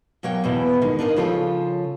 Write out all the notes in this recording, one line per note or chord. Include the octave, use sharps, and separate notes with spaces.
B2 F#3 A#3 C#5 G5
E2 B2 E3
D3 D#3 G#3
D4 D#4 A#4 D#5 F5
C#3 F3 F4 A4 C#5